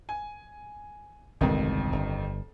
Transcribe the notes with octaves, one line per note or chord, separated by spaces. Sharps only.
G#5
G1 C2 F2 D#3 G#3
G1